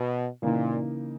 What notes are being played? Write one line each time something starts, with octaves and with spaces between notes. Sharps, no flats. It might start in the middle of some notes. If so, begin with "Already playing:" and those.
Already playing: B2
A#2 C#3 E3 A#3 D#4